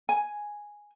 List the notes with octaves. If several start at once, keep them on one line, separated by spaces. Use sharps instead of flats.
G#5